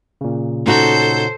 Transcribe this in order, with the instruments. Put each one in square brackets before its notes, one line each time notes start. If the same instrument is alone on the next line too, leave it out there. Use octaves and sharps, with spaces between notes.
[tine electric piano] A#2 C#3
[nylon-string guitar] C#4 D#4 F#4 [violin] A4 G6 [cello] C5